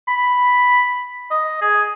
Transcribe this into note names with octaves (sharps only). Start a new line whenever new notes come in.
B5
D#5
G#4